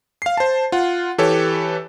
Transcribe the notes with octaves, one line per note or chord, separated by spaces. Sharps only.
F5 C7
C5 A5
F4 F#5
E3 G4 A4 B4 C#5